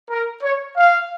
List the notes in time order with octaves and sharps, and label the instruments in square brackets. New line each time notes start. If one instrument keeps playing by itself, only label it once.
[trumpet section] A#4
C#5
F5